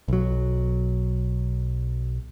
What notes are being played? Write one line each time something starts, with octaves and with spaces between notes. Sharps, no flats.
B1 F#3